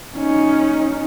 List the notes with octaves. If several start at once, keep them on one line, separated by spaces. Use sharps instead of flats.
C#4 D#4